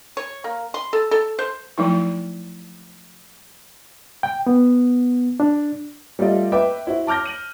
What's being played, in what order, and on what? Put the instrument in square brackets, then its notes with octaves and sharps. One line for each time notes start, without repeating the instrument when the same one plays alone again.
[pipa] C#5
A#3
C6
A4
A4
C5
[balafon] F3 F#3 A3 D#4 E4
[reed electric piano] G5
B3
D4
[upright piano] G3 A3 F4 D5 D#5
B4 E5 G5 D6
E4 F#4 C5
A5 D6 F6 G6 A#6
D#7 F#7